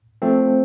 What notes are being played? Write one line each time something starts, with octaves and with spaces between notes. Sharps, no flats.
F3 A3 C4